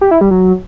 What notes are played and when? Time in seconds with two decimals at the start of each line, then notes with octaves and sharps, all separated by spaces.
0.01 G4
0.11 E4
0.21 G3
0.31 F#3